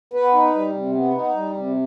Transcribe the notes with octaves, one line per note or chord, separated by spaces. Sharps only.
B3 B4
D#4
G3
C3
B3
D#4
G3
C3